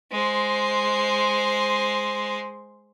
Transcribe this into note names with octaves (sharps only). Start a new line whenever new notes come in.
G#3 C5